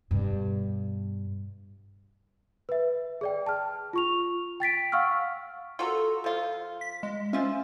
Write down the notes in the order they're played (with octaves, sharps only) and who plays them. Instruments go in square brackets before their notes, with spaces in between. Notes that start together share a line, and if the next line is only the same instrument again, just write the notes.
[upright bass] G2 B2
[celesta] B4 E5
G#4 D5 G5
A5 F6
F4 C#6 F7
G5 A6 B6 D7
F5 F#5 C#6 E6 F6
[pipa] F4 F#4 A#4 [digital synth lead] A4
[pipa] F3 F4
[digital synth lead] B6
G#3
[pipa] F3 F4 E5 [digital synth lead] C#4